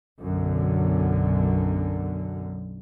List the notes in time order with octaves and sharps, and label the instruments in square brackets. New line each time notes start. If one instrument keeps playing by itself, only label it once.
[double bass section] B1 F#2 D3